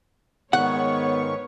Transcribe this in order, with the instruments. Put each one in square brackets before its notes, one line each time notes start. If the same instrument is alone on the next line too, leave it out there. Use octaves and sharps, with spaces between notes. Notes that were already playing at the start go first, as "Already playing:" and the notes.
[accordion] G#2 D#3 C#6 [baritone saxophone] B3 [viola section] B4 C#5 [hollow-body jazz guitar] F#5